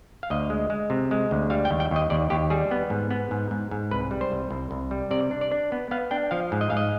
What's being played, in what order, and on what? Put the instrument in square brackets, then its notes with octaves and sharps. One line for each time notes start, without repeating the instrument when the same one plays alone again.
[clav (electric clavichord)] F5
D2 D#5
G#3
G#3
C3
G#3
D2
G3 F5
G5
D#2
G5
D#2 D#5
D#2 D5
D#2 G4
G3 G#4
B3
G#2
B3
G#2
G#2
G#2
C2 B4
G3
C5
C2
C2
C2
G3
C3 D5
D4
D5
D4
B3
B3 F5
D4 G5
F3 F5
G#2
D#5
G#2 F5
D#5